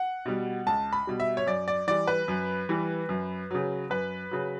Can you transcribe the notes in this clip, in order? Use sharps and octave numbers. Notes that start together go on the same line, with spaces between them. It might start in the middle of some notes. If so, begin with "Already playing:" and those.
Already playing: F#5
B2 G3
C#2 A5
B5
B2 G3
E5
C#5
F#2 D5
D5
E3 G3 D5
B4
F#2
E3 G3
F#2
C#3 F#3
F#2 B4
C#3 F#3